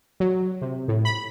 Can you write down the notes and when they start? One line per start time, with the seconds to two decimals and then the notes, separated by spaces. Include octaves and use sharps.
0.20 F#3
0.62 C3
0.88 A2
1.05 B5